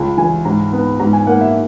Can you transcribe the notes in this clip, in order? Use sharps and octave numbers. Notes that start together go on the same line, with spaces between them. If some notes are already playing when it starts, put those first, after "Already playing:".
Already playing: C#2
E3 G#5
G#2 A#5
B3
G#2 A#5
G#5
A#3 F#5
E5